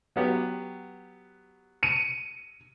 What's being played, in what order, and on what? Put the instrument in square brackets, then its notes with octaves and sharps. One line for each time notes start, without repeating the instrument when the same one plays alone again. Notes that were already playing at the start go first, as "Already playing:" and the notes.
[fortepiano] F#3 B3 G4
[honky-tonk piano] C#7 D#7